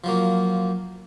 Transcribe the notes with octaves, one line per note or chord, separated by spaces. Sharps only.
F3 F#3 A#3